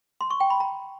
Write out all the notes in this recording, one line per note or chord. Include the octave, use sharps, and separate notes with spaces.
C6
C#6
G5
B5
A#5